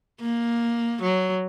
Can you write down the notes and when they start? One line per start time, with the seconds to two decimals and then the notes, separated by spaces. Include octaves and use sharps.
0.21 A#3
1.02 F#3